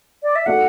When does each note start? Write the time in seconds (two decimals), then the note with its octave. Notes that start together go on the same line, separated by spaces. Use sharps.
0.23 D5
0.36 E5
0.46 A3 F#4 D5 F#5